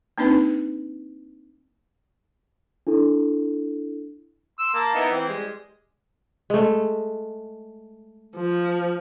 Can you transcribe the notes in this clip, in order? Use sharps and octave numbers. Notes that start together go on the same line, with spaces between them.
A#3 C4 D4 D#4 B4
D4 E4 A4
C6 E6
A#3 A5
B3 D#4 E4
E3 C4
G3 G#3
G#3 A3
F3